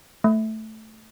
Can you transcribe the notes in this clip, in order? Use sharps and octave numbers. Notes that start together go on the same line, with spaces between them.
A3